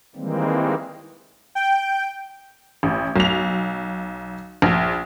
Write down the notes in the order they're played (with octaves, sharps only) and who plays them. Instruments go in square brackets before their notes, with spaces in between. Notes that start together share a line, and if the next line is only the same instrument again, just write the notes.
[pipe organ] D#3 E3 G3 G#3 A#3 C4
[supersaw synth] G5
[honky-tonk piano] A1
B1 F7
A#1